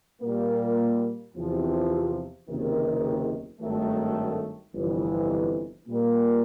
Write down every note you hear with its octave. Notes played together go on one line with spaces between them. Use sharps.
A#2 G3 A#3
E2 C3 F3
F#1 E2 C3 D#3
G#1 G2 D#3 F#3 A3
G1 F2 C3 E3
A#2 G3 A#3